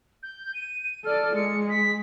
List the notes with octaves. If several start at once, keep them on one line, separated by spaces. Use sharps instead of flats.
G6
D#7
A4 D5 F6
G#3 C#7
B6